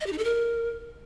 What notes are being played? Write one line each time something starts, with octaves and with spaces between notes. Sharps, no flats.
D#5
G4
D#4
A4
A#4